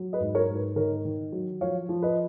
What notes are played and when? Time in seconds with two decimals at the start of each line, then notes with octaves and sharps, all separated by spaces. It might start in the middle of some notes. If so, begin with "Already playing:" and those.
Already playing: F#3
0.13 B4 D#5
0.20 G#2
0.35 A#4 C#5
0.48 G#2
0.56 B4
0.76 D#3 A#4 C#5
1.05 D#3
1.32 F#3
1.61 F3 C#5 F5
1.89 F3
2.02 B4 D#5